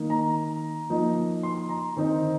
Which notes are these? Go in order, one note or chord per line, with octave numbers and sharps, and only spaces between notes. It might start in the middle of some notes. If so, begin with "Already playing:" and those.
Already playing: D#3 A#3 D#4
A#5
F3 A#3 D#4
C6
A#5
D#3 C4 D#4